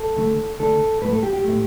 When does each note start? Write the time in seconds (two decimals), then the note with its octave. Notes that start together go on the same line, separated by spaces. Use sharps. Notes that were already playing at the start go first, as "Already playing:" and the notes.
Already playing: A4
0.17 D3 A3
0.60 D3 A3 A4
1.02 A2 A3 B4
1.13 A4
1.23 G4
1.33 G4
1.44 A2 A3